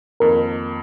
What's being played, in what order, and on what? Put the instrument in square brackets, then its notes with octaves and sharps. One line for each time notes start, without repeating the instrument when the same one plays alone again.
[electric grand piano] F2 D#3 A#3 [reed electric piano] A#4